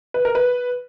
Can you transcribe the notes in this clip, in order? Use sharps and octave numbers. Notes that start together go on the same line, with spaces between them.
B4
A#4
B4